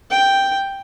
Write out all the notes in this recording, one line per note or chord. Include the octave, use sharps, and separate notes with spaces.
G5